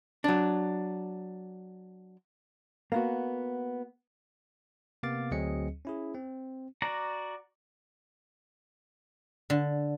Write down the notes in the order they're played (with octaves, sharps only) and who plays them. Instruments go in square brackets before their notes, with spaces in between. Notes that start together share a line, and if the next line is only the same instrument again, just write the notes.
[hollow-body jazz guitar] F#3 D4
A#3 B3 F#4
[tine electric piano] C3 A#3 B3 F5 D6 A6
D2 F#3 C4 G#4 D#5 C#7
C#4 E4 G#4
C4
[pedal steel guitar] F#4 D5 A#5
[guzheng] D3